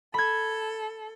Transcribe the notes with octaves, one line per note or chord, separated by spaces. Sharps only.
A4 B5 G#6